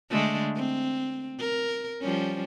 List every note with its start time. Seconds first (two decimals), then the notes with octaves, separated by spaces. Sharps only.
0.10 D3 G#3 A3
0.56 C4
1.40 A#4
2.01 F3 G3 C#4